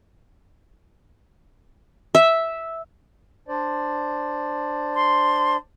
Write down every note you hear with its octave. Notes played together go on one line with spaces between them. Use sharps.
E5
D4 C5 D5
C6